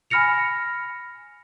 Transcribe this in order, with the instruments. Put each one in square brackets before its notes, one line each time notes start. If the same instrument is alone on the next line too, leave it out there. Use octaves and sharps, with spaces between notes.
[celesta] G#5 B5 F6 A#6 C#7 F7